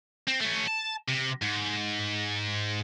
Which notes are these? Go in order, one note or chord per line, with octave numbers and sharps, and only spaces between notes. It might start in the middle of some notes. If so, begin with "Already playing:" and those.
C4
A3 C#4
A5
C3
G#2